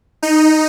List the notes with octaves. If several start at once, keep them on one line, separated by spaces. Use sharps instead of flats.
D#4